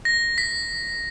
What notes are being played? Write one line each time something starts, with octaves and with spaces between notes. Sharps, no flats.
A#6
B6